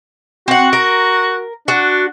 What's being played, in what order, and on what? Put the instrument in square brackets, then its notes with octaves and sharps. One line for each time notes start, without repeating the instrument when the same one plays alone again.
[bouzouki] C4 F#5 [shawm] F#4
[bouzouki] A#4
[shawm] D4 [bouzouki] F#4